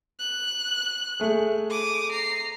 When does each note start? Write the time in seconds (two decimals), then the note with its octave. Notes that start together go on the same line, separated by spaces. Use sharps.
0.19 F#6
1.20 A3 G#4
1.70 D6 D#6
2.12 A#5 C7